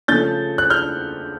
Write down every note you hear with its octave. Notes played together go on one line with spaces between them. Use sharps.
C#3 F3 A3 G6 A6
F#6
F6 G6